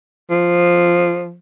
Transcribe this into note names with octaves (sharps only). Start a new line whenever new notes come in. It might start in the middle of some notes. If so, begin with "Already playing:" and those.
F3